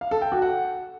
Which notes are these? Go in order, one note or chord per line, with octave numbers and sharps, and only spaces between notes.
F5
A4
G5
F#4
F#5